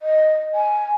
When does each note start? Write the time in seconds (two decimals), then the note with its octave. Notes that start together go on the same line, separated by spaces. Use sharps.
0.02 D#5
0.55 G#5